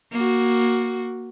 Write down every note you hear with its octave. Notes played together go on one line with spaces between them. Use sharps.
A#3 F#4